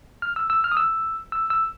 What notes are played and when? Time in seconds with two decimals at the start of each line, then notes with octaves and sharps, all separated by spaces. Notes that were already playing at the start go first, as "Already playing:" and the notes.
0.22 F6
0.36 E6
0.50 E6
0.64 F6
0.72 D#6
0.77 E6
1.32 E6
1.50 E6